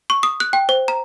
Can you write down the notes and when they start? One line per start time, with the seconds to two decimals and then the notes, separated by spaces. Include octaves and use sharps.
0.10 C#6
0.23 D#6
0.40 F#6
0.53 G5
0.69 C5
0.88 A#5